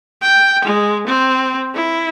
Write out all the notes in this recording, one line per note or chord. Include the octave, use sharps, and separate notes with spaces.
G5
G#3
C4
E4